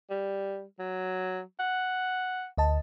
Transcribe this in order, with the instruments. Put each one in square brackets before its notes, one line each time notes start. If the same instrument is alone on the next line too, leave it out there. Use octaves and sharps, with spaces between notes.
[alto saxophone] G3
F#3
F#5
[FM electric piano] D2 D#5 A5